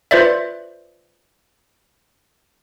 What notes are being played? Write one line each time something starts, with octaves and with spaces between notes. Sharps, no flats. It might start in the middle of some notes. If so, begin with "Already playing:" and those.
F4 B4 C5 D5 E5